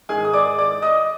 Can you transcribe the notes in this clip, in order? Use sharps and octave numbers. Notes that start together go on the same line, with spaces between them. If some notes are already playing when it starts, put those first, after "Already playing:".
G#2 D#3 G#4 G#5
D#6
D5 D6
D5 D6
D#5 D#6